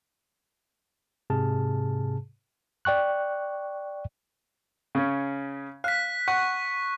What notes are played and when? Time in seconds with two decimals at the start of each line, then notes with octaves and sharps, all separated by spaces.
1.30 G#2 C3 G#4 A5 F6
2.85 D5 G5 C#6 F#6
4.95 C#3 C#4
5.84 F5 F#6 B6
6.28 F#5 C#6